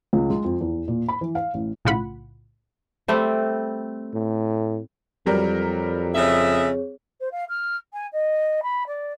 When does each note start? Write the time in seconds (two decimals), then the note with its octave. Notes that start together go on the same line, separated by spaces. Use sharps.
0.13 C#2
0.30 G#3
0.44 F2
0.61 E2
0.88 A#2
1.08 B5
1.21 E3
1.35 F5
1.54 A1
1.85 B1 A2 C#3 F4 F#5 B5
3.08 G3 A3 C4
4.14 A2
5.26 F2 F#3 G3 A#4
6.15 C#3 C4 G#4 C#5 D#5 E5
7.20 C5
7.32 F5
7.49 F6
7.93 G#5
8.13 D#5
8.63 B5
8.87 D5